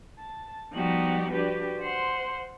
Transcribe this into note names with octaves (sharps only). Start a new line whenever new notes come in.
A5
F3 G3 B3 D#4 F#4 G4
D4 F#4 G4 B4
C5 F#5 C6